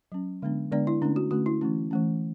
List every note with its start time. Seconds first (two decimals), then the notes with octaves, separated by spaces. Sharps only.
0.12 F#3 C#4
0.42 D3 G#3 B3 D4
0.72 D3 G#3 B3 D4 D5
0.87 E4
1.01 D3 A3 C#4 D4
1.16 F#4
1.31 D3 A3 C#4 F#4
1.46 E4
1.61 E3 A3 C#4
1.91 E3 A3 C#4